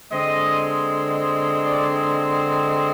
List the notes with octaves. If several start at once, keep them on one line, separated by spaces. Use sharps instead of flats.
D3 G#3 C4 D#5
D5